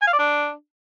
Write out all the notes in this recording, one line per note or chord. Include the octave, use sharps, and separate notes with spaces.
G#5
F5
D5
D4